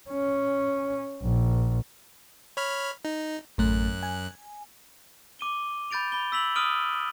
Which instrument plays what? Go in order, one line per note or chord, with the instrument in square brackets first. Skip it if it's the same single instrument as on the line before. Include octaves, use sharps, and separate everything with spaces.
[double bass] C#4
A#1
[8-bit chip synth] C#5 B5 F6
D#4
[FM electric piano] A1 A3 [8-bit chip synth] F#2 F#6
[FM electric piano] G#5
[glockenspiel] D6 D#7 G7
B5 G6 A6 D7 F7
B5 G7
E6 B6 F7 F#7
D#6 F6 D7 D#7 F#7 G7